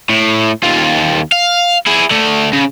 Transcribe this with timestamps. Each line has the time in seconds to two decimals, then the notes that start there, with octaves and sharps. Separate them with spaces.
0.10 A2
0.63 D#2 F4
1.32 F5
1.87 E4 G#4
2.11 D3 A3
2.53 C#3